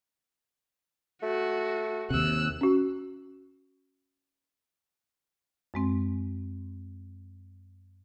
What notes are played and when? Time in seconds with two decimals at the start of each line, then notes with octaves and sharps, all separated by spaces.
1.23 A3 F#4
2.10 D#2 C3 E6 F#6
2.61 C#4 F#4
5.74 F#2 G#3 C4